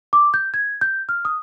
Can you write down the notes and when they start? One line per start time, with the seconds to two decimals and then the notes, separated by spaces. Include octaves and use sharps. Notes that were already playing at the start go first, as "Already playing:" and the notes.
0.13 D6
0.34 G6
0.54 G#6
0.81 G6
1.09 F6
1.25 D#6